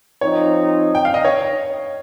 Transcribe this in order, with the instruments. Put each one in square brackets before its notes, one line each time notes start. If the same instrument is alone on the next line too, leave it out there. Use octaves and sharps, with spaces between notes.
[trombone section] F3 C4 D#4 [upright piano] C#5
[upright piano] G5
F5
D#5
C#5